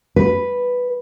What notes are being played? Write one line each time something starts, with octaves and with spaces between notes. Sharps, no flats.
B4